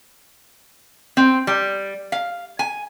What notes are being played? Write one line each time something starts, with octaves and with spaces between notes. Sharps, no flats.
C4
G3
F5
G#5